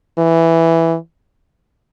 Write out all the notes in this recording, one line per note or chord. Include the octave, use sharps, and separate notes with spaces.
E3